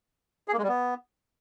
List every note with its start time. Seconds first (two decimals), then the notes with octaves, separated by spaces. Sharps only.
0.48 G#4
0.53 A#3
0.58 G#3
0.63 G3
0.68 B3